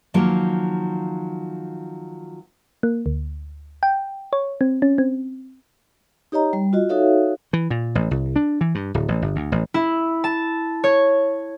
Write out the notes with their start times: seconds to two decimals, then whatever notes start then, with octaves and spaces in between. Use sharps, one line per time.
0.14 D#3 F3 F#3 A#3
2.83 A#3
3.06 D2
3.83 G5
4.33 C#5
4.61 C4
4.82 C#4
4.98 C4
6.32 D#4 G4 C#5 D#5 A#5
6.53 G3
6.73 F4 F#4 D#5
6.89 D#4 F#4 A4 C#5 E5 F5
7.53 E3
7.70 A#2
7.95 A1
8.11 C2
8.36 D4
8.61 E3
8.75 G2
8.94 D1
9.08 A1
9.22 G1
9.36 D2
9.52 A1
9.74 E4
10.24 A5
10.84 C#5